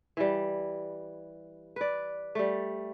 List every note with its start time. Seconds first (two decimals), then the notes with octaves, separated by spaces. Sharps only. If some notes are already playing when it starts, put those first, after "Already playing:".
0.17 E3 G3
1.76 B4 D5
2.35 G3 A3